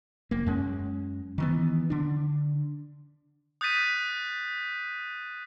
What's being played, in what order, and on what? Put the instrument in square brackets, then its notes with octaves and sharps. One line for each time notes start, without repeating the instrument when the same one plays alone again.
[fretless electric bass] F1 A#3
F#2 G#3 C#4
D#3 E3 B3
D3 D4
[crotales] D#6 F#6 G6 A6 B6 D#7